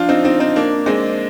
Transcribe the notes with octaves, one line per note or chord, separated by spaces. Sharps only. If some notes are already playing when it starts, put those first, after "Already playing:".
Already playing: F3 D4 F4
C4 D#4
C4 D#4
C4 D#4
A#3 D4
G#3 C4